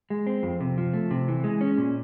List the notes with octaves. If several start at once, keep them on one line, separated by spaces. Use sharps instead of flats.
G#3
C4
F2
C3
F3
A3
C3
E3
G#3
C#4
A#2